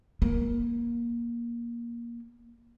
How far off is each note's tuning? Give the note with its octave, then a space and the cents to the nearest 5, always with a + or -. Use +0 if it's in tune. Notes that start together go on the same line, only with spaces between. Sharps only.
A#3 +15